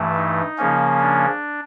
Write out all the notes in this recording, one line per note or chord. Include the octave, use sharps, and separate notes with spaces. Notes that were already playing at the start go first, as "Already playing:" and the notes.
Already playing: G2 E3 A3
D#4
C#3 F3 A#3 C#4
D4